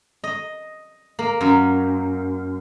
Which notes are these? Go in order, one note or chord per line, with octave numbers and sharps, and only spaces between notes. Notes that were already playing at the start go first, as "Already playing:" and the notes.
D#5
A#3
F#2